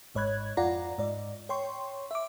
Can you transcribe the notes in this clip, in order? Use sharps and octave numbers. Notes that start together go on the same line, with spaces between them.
G#1 G#2 C#5 B5 F#6 G#6
F2 F4 D5 F#5 A#5 A#6
G#2 D5
C#5 G5 C6 C#6
E5 D6